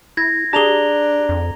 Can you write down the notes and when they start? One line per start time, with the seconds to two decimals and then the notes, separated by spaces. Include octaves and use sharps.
0.17 E4 G#6 A#6
0.53 D4 G4 G#4 A5 A#5 F7 G7
1.29 F2